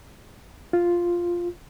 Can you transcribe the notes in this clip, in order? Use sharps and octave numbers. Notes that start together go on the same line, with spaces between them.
F4